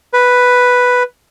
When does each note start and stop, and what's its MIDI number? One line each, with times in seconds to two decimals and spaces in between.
0.13 1.03 71